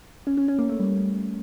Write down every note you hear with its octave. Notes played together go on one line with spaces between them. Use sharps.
C#4
C#4
C#4
A#3
A3
G3